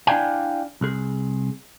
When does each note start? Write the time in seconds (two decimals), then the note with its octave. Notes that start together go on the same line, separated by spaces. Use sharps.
0.07 D4 E4 D5 F5 G5 G#5
0.81 C2 G#4